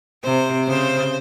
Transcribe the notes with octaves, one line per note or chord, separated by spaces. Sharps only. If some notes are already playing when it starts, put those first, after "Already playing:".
C3 C5
C#3 C5